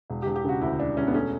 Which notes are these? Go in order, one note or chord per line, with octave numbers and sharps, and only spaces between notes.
E1
E1 G4
G4
C#3 F#4
D2 E4
E1 D4
E1 C#4
B3
A3 C#4